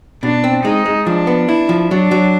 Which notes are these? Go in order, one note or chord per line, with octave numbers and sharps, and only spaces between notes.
B2 D4
C4
G#3 D#4
G#3
F3 D4
B3
E4
F3
F#3 D4
F#3